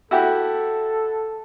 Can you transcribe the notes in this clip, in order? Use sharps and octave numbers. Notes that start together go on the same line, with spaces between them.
E4 F#4 G4 A4